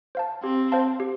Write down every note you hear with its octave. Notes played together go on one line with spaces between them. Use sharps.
C5 F5 A5
C4 G4
C5 F5 A5
G4